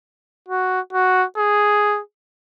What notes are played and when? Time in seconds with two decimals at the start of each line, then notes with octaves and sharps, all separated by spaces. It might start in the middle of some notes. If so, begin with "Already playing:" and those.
0.49 F#4
0.93 F#4
1.38 G#4